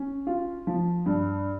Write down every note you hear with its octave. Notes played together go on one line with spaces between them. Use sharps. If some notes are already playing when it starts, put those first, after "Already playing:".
Already playing: C#4
F4
F3
G2